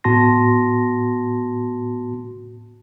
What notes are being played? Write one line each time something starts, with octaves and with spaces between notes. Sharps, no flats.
A2 B3 F#4 A5 C6 A#6